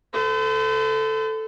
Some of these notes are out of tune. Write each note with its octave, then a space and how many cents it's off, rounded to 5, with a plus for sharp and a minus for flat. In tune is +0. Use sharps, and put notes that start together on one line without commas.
A4 +0 C5 -45